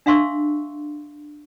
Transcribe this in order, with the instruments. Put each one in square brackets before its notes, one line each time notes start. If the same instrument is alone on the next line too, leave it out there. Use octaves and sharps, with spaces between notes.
[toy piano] D4 E5 F5 C6 C#6 E6